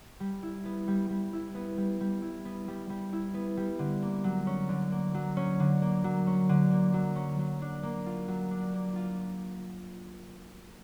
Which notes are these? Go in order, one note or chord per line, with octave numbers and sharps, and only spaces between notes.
G3
E4
B3
G3
G3
E4
B3
G3
G3
E4
B3
G3
G3
E4
B3
G3
D3
A#3
F#3
C#4
D3
A#3
F#3
C#4
D3
A#3
F#3
C#4
D3
A#3
F#3
C#4
F#3
D4
A#3
F4
F#3
D4
A#3
F4